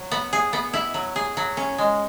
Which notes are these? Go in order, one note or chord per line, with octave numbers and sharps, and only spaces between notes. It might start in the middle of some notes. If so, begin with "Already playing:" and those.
Already playing: F#3
B3
G#4
B3
E4
F#3
G#4
F#3
C#4
G#3